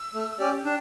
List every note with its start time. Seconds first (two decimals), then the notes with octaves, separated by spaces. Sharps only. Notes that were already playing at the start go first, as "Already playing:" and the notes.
Already playing: E6
0.14 A3
0.39 C#4 G4 D5
0.64 D4 G5